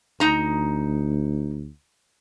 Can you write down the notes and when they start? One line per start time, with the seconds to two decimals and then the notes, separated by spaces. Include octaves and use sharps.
0.20 D2 D#4 A#5